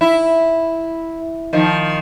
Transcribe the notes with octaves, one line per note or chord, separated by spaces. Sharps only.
E4
D#3 F3